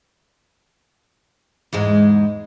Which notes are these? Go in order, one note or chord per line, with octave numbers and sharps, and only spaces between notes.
E2 G#2 G#3